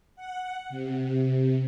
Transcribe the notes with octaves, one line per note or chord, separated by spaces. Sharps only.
F#5
C3